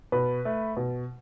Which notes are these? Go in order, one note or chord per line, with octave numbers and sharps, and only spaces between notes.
B2 B4
A3
B2